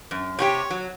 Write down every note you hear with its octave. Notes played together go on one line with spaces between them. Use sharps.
F#2
C3 F#4 G4 C#5
F#3